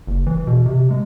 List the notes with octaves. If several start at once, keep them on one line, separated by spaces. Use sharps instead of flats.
F#1
E3
B2
C3
G#3